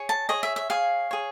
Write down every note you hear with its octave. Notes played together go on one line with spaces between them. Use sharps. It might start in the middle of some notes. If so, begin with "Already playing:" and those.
Already playing: G#4 C#5
A5
G#4 C#5 D#5
E5
E5
G#4 C#5 F5
G#4 C#5